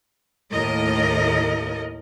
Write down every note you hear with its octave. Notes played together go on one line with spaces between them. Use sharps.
D#2 A2 A#4 D#5